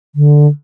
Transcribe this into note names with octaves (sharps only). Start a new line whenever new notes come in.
D3